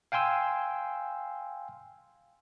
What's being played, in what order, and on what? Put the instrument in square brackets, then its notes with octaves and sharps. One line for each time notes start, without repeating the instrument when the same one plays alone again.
[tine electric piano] F5 G5 G#5 C6 E6